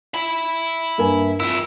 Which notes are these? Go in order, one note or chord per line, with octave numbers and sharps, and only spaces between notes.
E5 B5
G2 A#3 G#5
F2 E4 E6